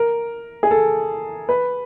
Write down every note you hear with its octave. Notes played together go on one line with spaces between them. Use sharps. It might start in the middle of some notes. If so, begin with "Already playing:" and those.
Already playing: A#4
G#4
A4
B4